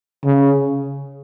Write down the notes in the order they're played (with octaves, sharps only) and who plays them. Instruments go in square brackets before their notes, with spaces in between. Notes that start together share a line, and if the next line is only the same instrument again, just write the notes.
[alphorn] C#3